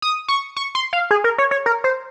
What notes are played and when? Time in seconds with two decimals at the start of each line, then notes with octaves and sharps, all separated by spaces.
0.02 D#6
0.28 C#6
0.57 C#6
0.75 C6
0.93 F5
1.11 G#4
1.24 A#4
1.38 C#5
1.51 C#5
1.66 A#4
1.84 C5